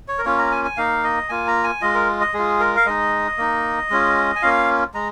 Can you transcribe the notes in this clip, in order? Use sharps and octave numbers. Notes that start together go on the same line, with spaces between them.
C#5
A#4
A#3 C#4 F4 C#5
A#5
G#5
G#5
A#3 D#4 F5
D#5
A#3 F4 G#5
A#5
G#5
G#3 F4 D#5
A#4
D#5
G#3 F4 G#4
A#4
F5
G#3 D#4 D#5
A#3 D#4
G#3 C#4 F4
G#5
A#3 C#4 F4 F5
G#3 A#5